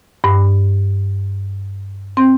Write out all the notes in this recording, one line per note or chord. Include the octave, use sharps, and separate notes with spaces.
G2
C4